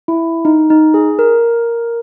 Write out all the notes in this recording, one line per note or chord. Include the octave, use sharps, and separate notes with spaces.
E4
D#4
D#4
G#4
A#4